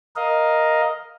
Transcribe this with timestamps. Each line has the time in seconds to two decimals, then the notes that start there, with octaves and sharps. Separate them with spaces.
0.16 A#4 D#5 F5